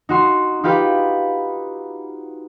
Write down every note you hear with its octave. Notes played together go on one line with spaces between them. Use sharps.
D#4 F#4 C6
D#4 F4 G4 B4